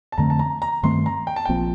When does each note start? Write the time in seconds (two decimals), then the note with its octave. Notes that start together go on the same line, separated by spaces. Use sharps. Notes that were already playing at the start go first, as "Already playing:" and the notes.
0.12 A5
0.18 F2 D3 A3 C4 A#5
0.30 A5
0.39 A#5
0.62 A#5
0.83 G2 D#3 A3 C4 C6
1.06 A#5
1.27 G5
1.36 A5
1.45 A#1 A#2 F3 C4 G5